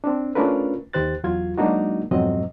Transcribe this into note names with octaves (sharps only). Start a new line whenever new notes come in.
C4 D4
A3 C#4 D4 F4 A#4 B4
D#2 D#3 G4 C5 F#6 A6
E2 F#3 F4 G#6
F#3 G#3 A#3 D4 D#4 F#4
F2 G#2 B2 F#3 C4 D#5